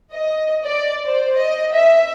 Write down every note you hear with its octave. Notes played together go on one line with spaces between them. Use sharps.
D#5
D5
C5
D#5
E5